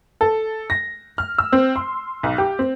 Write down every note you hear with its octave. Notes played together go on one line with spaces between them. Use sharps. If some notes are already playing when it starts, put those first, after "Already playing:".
A4
A#6
F6
E6
C4
C6
B1
G4
C4